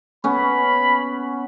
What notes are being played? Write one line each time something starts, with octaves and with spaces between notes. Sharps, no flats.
B3 C#4 B5